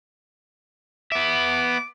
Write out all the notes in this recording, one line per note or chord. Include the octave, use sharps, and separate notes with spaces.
B3 E5 D6